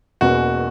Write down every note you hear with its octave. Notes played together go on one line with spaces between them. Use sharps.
E1 E2 B2 A#3 C#4 F#4